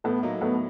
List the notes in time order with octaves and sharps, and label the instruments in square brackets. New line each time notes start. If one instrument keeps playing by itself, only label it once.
[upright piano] A2 [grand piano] A3 B3
[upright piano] F#3 A#3 D#4
[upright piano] A2 [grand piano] A3 B3